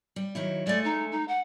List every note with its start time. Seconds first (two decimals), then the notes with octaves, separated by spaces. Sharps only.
0.16 G3
0.35 D#3 F#3 E4
0.67 G#3 A3 D5
0.85 D#4
1.12 D#4
1.28 F#5